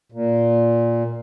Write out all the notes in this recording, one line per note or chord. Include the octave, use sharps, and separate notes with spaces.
A#2